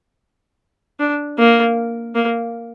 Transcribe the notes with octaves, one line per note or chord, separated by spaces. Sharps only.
D4
A#3
A#3